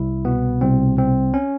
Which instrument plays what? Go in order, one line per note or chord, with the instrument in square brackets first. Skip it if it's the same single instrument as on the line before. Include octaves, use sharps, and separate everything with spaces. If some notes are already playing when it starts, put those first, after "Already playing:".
Already playing: [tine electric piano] C2 E4
B2 B3
C2 C4
C2 C4
C#4